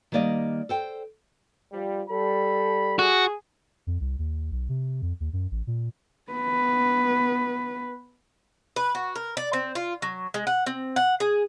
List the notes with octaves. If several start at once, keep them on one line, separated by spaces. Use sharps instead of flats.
D#3 G3 A#3 D5 D#5
A4 C5 G5
F3 G3
G3 A4 B5
F#4 G#4
F2
C2
D#2
B1
C3
F2
D#2
F#2
A1
A#2
B3 B4
B4
F#4
A#4
D5
C4
F4
F#3
G#3
F#5
C4
F#5
G#4